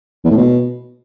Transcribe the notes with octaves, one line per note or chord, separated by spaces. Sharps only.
E2
A2
B2